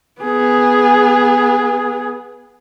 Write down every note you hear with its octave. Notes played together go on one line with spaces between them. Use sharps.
B3 G#4